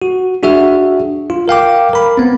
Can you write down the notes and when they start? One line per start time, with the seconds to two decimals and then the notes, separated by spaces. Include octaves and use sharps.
0.02 F#4
0.43 D4 F#4 G#4 E5
1.30 F4
1.48 A#4 F5 G5 D6
1.93 A#4 B5
2.17 B3 C4